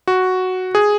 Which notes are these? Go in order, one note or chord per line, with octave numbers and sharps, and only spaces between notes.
F#4
G#4